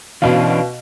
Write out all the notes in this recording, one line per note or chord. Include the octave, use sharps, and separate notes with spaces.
B2 E3 C#4 D4 F5